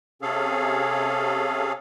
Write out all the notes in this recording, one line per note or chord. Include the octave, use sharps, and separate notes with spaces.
C3 C#4 G#4 A4 F5